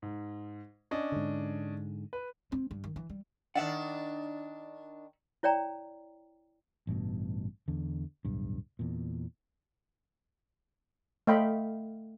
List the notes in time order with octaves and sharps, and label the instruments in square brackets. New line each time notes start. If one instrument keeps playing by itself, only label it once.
[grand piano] G#2
C#4 D4 D#5
[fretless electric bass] G#2 D3
[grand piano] B4
[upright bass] C4
G2
D#3
E3
G3
[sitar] D#3 D4 [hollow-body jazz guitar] D5 E5 F#5
[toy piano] E4 C#5 D5 G5 A#5
[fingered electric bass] A1 G2 B2
E2 D3
D1 B1 G2
E2 A#2
[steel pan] A3 D#5 F5 G5 B5